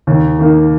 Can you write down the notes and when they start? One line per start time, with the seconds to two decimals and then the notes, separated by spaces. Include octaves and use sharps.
0.07 D#2
0.39 D#3 A#3